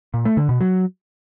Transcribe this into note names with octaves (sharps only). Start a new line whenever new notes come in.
A#2
A3
D3
B2
F#3